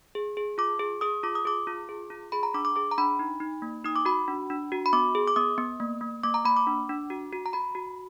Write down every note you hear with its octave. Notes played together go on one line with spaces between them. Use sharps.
G#4
G#4
F4 D6
G#4
G#4 D#6
F4 D6
D#6
G#4 D6
F4
G#4
F4
G#4 B5
A#5
D4 D6
D6
G#4 D6
A#5
D4 B5
D#4
D#4
A#3
D#4 D#6
D6
F#4 B5
D4
D4
F#4
B5
B3 D6
G#4
D6
B3 D#6
B3
A#3
A#3
A#3 D6
A#5
A#3 B5
D6
D4
D4
F#4
F#4
A#5
F#4 B5
F#4